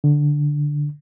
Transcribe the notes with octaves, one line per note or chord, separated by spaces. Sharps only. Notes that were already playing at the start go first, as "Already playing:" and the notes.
D3